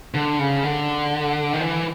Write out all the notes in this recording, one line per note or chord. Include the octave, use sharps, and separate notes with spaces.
D3
C#3
D3
D#3
E3